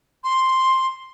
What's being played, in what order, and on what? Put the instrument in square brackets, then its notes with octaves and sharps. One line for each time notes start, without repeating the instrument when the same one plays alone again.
[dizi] C6